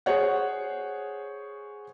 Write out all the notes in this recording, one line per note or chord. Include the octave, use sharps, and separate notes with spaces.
G#4 C5 C#5 F#5